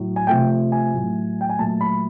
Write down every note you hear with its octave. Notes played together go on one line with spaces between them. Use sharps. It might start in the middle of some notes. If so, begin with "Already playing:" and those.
Already playing: A2 F#3
G#5
C3 F3 A3 G5
G#5
A2 F#3 A3
G5
G#5
A#2 F#3 A3 A5
B5